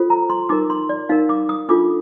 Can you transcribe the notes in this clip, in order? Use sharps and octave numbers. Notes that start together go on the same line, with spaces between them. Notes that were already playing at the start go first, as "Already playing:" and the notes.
Already playing: F4 A4 C5
A#5
C6
D#4 A#4 D6
C6
D5
D#4 A#4 F5
D6
D#6
D4 F4 A4 D6